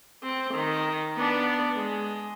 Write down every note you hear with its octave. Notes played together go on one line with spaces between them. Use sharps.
C4
D#3
B3 D4
G#3